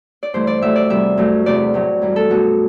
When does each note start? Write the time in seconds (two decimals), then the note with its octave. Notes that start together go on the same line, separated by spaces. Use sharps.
0.23 D5
0.34 G2 E3 A3 C5
0.47 D5
0.61 A2 F#3 A3 E5
0.76 D5
0.90 E2 C3 G3 E5
1.18 F#2 F#3 A3
1.46 E2 C3 E3 A3 D5
1.74 A2 F#3 A3
2.02 F#2 E3 G3
2.16 A4
2.29 B2 F#3 A3 F#4